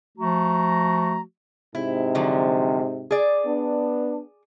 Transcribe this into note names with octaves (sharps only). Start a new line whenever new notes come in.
F3 A3 F#4 A#5
G#2 C3 E4
D3 F3 F#3
G#4 D5
B3 D4